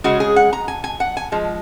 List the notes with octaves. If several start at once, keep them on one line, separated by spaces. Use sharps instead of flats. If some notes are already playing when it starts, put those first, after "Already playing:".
C#3 G#3 C#4 F#4
G#4
F#5
A#5
G#5
G#5
F#5
G#5
F3 G#3